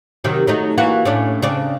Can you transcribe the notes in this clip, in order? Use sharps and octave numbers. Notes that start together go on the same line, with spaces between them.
C3 D#3 F#3
F#3 A3 D#4
E3 A#3 F#4
A2 C#4 D4
C#3 C4 D4